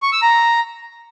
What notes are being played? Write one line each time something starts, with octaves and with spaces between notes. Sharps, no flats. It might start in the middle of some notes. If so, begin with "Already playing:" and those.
C#6
E6
A#5